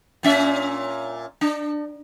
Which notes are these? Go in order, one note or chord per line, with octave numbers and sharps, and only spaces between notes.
A#2 C#4 E5
D4